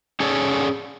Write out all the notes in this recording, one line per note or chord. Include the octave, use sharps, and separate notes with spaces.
C#4 G#4 A4 C#5 D5